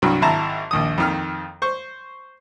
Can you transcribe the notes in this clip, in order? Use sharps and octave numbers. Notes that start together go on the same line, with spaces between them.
C2 G2 F#3
G#1 E4 A5 A#5
A#1 D#2 D#6
F2 D#3 F6
C5 C#6